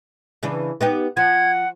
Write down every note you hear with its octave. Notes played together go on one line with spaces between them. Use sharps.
C#3 E3 D4
B3 D#4 G4
F3 F#5 G#6